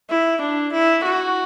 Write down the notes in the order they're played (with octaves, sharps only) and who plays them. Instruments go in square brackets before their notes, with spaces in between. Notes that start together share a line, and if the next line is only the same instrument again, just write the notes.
[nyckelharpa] E4
D4
E4
F#4